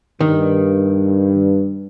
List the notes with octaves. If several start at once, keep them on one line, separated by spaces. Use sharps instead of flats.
G2 D#3